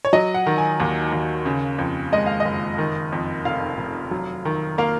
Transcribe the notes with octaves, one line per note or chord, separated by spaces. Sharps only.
C#5
F#3 D#5
F#5
D#3
G#5
D#2
D#2
C#3
F2
G#3 D#5
F5
D#5
F#1
D#3
F2
F1 F5
F1
F#3
D#3
A#3 F5